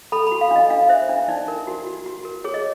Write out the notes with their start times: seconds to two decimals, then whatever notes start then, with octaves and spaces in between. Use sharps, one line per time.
0.12 A4 B5
0.27 B5
0.32 F#4
0.41 F5
0.51 D4 D#5
0.70 D4 F5
0.89 C5 E5
1.09 D4
1.28 D#4 D5
1.48 A#4
1.67 F#4
1.87 F#4
2.06 F#4
2.25 A#4
2.44 G#4 C#5
2.54 D#5